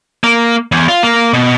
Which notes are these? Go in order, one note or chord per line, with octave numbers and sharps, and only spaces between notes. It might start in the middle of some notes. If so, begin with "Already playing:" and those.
A#3
E2
F4
A#3
B2